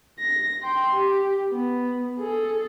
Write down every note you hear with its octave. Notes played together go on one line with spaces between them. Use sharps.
A#6
G5 C6
G4
B3
G#4 A4